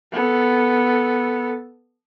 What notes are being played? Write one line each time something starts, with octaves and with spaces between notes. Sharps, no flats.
B3 A4